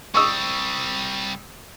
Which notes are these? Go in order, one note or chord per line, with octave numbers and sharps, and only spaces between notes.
C2 G3 C#6 D#6 E6